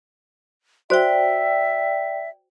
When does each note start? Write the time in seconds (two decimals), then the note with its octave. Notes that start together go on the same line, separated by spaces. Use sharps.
0.90 F#4 C5 D5 E5 G5